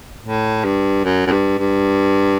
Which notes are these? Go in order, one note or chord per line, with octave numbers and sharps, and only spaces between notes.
A2
G2
F#2
F#2
G2
G2